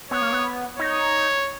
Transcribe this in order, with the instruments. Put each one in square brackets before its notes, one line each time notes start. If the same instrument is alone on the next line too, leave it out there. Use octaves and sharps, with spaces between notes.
[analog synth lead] B3 [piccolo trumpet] C#5
[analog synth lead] A#3
B3
[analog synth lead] D#4 [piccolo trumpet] C#5